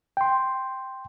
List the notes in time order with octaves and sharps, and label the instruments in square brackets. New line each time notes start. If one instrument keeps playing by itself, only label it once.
[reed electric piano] G5 C6